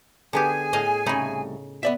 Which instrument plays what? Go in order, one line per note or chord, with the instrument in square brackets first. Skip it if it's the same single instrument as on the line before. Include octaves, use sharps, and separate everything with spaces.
[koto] D3 B3 G4 [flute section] G#4 G#5
[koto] A2 D#5 F5
[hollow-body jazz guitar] C2 A3 B5 [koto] C#3 D#4
[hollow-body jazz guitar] B3 D5 E5